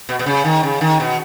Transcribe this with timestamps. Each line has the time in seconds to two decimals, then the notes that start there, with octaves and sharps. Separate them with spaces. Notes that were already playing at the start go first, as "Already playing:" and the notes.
0.09 B2
0.19 B2
0.26 C#3
0.45 D#3
0.63 C#3
0.81 D#3
1.00 B2